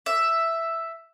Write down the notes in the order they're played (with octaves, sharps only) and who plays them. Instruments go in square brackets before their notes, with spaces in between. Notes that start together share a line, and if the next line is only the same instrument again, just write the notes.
[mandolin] E5